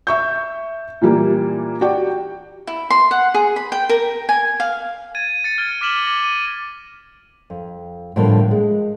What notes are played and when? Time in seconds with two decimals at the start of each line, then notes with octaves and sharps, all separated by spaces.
0.07 E5 C#6 G6
1.01 A#2 E3 G3 A#3
1.81 F#4 G4 D5 G5
2.67 E4
2.90 C6
3.11 F#5
3.34 G#4
3.56 B5
3.72 G5
3.89 A#4
4.29 G#5
4.60 F5
5.15 G#6 A6 D#7
5.44 A6 C#7 D#7
5.58 F6 G#6 D7 G7
5.81 D6 F6 B6 E7 F#7 G7
6.07 D6 A#6
6.24 D#7
7.50 F2
8.16 A2 D3 F3 G3 A#3
8.51 G#3